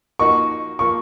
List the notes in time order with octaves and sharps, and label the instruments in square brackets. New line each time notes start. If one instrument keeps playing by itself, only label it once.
[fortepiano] F3 A#3 D#4 F#4 [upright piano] C#6
[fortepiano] F3 A#3 F4 [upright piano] C#6